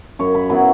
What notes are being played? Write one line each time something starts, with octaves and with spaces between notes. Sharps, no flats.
F#2 C#5
B5
F#3 B3 E4 B5